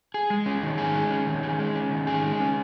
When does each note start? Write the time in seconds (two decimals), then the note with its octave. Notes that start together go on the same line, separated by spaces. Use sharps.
0.14 G#4
0.30 G#3
0.46 C#4
0.63 D#3
0.78 G#4
0.95 G#3
1.11 C#4
1.27 D#3
1.43 G#4
1.59 G#3
1.75 C#4
1.91 D#3
2.07 G#4
2.23 G#3
2.40 C#4